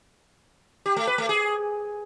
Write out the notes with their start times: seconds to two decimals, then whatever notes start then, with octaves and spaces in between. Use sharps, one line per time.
0.86 G4
0.96 A3
1.07 B4
1.18 A3
1.29 G#4